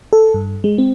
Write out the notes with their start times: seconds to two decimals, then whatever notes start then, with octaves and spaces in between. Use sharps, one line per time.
0.13 A4
0.34 G2
0.64 G#3
0.78 C4